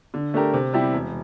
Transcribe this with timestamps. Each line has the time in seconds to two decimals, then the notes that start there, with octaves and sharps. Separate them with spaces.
0.14 D3
0.34 A3 D4 G4 A#4
0.53 C3
0.73 G3 C4 E4 G4
0.93 E1